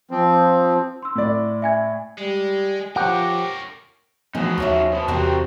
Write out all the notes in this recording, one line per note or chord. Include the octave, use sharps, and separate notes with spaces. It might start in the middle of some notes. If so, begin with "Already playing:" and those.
F3 C4
C6 E6
A2 D5
E5 G#5 G#6
G3 G#3
F3 G4 A#4 C#5 F#5
E3 F3 A3 B3 D#4 F#4 G#4
D#2 F3 C#4 E5
B2 B3
E2 C3 C4 F#4 G4 A#4